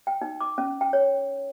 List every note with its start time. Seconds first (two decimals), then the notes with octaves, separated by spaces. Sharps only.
0.07 G5
0.22 D#4
0.40 D6
0.58 C#4
0.81 G5
0.93 C#5